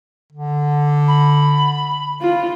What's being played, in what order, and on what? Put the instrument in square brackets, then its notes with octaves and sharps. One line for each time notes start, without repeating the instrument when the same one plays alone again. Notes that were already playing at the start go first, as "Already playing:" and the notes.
[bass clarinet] D3
[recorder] B5
[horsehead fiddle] F4